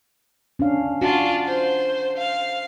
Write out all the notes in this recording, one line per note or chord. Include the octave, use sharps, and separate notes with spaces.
C#4 D4 F5
D4 F4 F#4
C5
F5